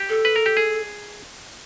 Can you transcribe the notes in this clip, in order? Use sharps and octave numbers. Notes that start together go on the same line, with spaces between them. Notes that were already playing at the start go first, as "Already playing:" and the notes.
Already playing: G4
A4
B4
A#4
G4
G#4